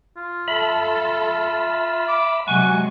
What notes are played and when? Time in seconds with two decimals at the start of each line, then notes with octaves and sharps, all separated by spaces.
0.17 F4
0.48 A4 E5 B5
2.07 D6
2.48 C3 F#3 G#3 F#5 G#5 C#6